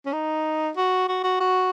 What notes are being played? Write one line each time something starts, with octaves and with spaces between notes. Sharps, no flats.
C#4
D#4
F#4
F#4
F#4
F#4